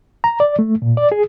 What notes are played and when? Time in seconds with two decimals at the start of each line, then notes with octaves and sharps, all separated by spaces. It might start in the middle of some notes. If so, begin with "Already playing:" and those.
0.24 A#5
0.40 D5
0.59 A3
0.82 A#2
0.97 D5
1.12 G#4